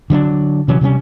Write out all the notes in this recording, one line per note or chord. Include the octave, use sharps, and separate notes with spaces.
D3 F#3 B3 D4
C3 E3 F#3 C#4
C3 G3 A3 C#4